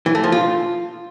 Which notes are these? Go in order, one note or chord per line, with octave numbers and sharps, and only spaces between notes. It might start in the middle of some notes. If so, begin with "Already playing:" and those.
E3
A3
F3
F4